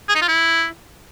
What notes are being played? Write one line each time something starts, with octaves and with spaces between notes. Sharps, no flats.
G#4
D#4
F4
E4